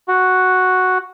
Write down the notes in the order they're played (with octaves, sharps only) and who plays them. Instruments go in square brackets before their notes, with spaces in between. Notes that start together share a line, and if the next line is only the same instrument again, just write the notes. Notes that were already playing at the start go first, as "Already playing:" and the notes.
[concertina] F#4